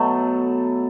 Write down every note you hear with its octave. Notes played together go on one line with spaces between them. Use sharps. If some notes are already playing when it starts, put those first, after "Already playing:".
Already playing: B2 F#3 A3 A4